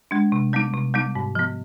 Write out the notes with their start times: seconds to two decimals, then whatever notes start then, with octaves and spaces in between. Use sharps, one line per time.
0.11 G#3 D4
0.32 C3
0.53 G3 B3 D#4
0.73 C3
0.94 G3 B3 D#4
1.15 G#2
1.35 F3 B3